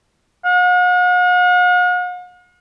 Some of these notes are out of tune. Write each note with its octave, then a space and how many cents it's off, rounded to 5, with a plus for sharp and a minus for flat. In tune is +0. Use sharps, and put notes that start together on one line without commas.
F#5 -45